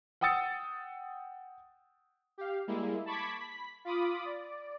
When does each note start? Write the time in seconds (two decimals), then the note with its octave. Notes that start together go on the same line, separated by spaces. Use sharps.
0.21 F#5 G5 D#6 E6 A6 C#7
2.38 G4 F5
2.67 G3 G#3 A#3 E4
3.06 A5 B5 C#6 D6 G#6 B6
3.39 B5 B6
3.85 F4 B5 D6 D#6
4.25 D5